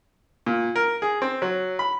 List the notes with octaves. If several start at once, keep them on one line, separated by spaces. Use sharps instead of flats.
A#2
A#4
G#4
C4
F#3
B5